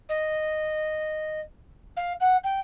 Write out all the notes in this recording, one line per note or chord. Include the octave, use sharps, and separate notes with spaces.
D#5
F5
F#5
G5